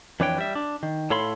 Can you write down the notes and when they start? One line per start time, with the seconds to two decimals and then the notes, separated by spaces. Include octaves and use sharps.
0.20 F2 E3 D4 B4 C#5 G5
0.38 G3 E5
0.55 D4
0.83 D#3
1.10 A2 A4 C#5 F5 B5 C6